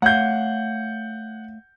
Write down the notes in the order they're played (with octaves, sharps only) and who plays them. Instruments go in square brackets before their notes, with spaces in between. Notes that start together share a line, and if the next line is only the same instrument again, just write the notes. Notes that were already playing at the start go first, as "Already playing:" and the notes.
[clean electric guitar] A3 C#5 F5 [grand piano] F#5 G6